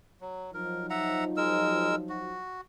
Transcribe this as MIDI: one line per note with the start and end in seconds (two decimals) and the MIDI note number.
0.21 0.51 54
0.54 2.41 53
0.54 2.41 54
0.54 2.41 63
0.54 0.86 70
0.90 1.24 76
0.90 1.24 78
0.90 1.24 82
1.37 1.95 56
1.37 1.95 70
1.37 1.95 88
2.09 2.61 66